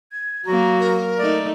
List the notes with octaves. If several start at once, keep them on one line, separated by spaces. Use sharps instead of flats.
G#6
F#3 A#3 F#4 A#5
A#4
A3 D#4 D5